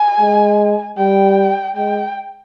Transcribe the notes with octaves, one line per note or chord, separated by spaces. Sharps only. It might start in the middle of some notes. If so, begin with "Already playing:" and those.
Already playing: G#5
G#3
G3 G5
G#3 G5